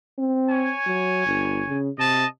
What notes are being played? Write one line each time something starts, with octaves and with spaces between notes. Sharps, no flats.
C4
C#5 G#5
F#3
G1
C#3
C3 D#5 A5